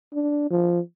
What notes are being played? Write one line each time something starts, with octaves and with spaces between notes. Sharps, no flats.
D4
F3